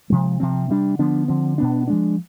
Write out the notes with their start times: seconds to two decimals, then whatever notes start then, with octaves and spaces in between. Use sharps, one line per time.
0.10 C3 F3 G#3
0.40 C3 F3 C4
0.69 C3 G3 D4
0.99 D3 F3 B3 D4
1.28 D3 F3 C4
1.58 B2 B3 D4
1.87 F3 G#3 D4